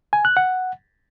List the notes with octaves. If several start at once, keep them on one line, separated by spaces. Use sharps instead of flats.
G#5
F#6
F#5